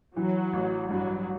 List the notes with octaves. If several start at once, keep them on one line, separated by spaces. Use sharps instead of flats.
E3 F#3
A1
G2 F#3